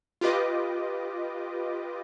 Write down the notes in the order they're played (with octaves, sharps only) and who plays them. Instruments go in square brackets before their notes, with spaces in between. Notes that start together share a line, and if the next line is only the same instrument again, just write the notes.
[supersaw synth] F4 G4 B4 D#5 D6